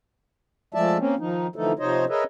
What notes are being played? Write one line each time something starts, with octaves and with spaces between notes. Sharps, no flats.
F3 G#3 A3 D5 E5 A5
A#3 C4 C#4
D#3 F3 D#4
D3 E3 F3 A3 D#4 A4
C3 F3 D#4 C5 C#5 D#5
G#4 A#4 B4 C#5 D#5 E5